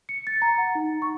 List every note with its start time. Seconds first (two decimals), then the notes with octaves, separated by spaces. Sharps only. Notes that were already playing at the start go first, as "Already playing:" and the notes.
0.09 C#7
0.27 A6
0.42 A#5
0.58 F#5
0.75 D#4
1.02 C#6